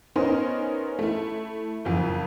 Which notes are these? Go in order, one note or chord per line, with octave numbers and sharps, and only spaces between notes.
B3 C#4 D#4 A#4 C5
A3 E4
F#1 F2